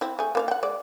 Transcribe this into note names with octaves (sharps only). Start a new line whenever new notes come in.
C4 E4
A3 G#4
A#3 C5 F5
F#5 G5
G#3 D5